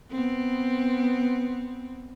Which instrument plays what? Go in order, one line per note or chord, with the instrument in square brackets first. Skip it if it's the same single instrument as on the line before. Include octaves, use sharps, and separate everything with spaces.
[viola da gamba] B3 C4